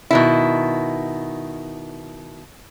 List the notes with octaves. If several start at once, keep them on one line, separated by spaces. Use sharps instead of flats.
B2 D#3 E4